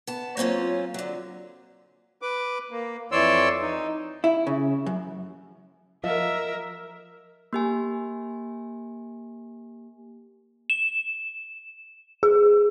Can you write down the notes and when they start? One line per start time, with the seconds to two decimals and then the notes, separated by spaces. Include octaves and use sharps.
0.07 B3 A5
0.37 F#3 A#3 C4 C#4 F4
0.94 D3 F#3
2.22 B4 D6
2.71 A#3
3.12 F2 E3 C#5 D5 C6 E6
3.62 D#4
4.24 E4
4.47 C#3
4.86 F#2
6.04 F3 F4 A#4 D#5 E5
7.53 A#3 G4 G#5
10.70 E7
12.23 G#4